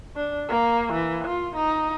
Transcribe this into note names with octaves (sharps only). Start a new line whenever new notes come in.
D4
A#3
E3
F4
D#4